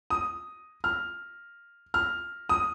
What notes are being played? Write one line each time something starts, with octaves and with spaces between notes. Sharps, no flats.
D#6
F6
F6
D#6